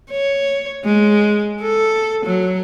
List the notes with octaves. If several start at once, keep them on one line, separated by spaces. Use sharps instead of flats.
C#5
G#3
A4
F#3